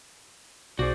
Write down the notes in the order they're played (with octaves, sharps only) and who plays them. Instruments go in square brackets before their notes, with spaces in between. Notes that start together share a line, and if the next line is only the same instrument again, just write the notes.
[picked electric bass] B1 [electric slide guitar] F#4 G#4 [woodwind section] C5 D5